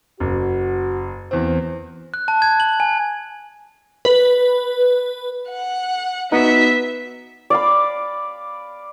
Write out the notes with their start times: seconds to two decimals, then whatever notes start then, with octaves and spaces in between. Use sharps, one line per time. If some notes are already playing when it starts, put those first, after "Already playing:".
0.20 F#1 F#4
1.31 E2 C4
2.14 F#6
2.28 A5
2.42 G#6
2.60 F#7
2.80 G#5
4.05 B4
5.49 F#5
6.32 B3 D#4 F#4 E5 B6
7.50 D5 F5 B5